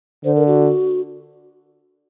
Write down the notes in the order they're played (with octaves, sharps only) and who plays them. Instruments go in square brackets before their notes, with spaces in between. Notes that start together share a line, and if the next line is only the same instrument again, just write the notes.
[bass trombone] D3 [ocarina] C5
[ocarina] A#4
F#4